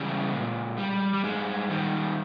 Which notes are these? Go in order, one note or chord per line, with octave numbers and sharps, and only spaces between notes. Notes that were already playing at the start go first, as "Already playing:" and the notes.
Already playing: C#3 E3 G3 G#3
A#2
G3
G3
G2 G#3
D#3 G3